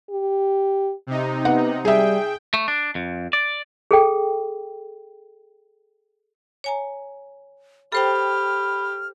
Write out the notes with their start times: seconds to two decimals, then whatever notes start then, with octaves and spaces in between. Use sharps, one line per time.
0.11 G4
1.07 C3 D#4
1.45 B3 F#5
1.85 G3 G#4 E5 G5
2.54 A3
2.68 D4
2.95 F2
3.33 D5
3.91 G#4 A4 G5
6.64 C#5 G#5 A#5
7.92 G4 A4 C5 G5 B5 F6